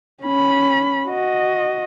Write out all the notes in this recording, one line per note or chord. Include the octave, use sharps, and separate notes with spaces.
C#4 B5
F#4 D#5